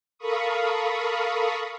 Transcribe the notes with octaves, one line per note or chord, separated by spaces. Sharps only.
A4 A#4 F5 B5 C#6 D#6